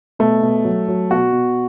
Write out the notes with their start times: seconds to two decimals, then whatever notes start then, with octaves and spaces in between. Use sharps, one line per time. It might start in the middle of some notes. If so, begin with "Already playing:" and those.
0.19 B2 A3
0.43 B2
0.64 F#3
0.88 F#3
1.11 B2 F#4
1.32 B2